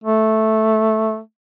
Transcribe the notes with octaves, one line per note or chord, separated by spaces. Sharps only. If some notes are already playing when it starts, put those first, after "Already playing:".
A3